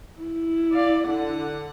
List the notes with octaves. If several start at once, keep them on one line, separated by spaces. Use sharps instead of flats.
E4
D5 F5
D3 F#5